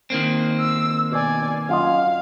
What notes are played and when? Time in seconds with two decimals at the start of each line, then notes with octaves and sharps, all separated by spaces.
0.10 D#3 A#3 C4
0.60 E6
1.12 B2 D5 G#5
1.69 F#2 F4 D#5 F5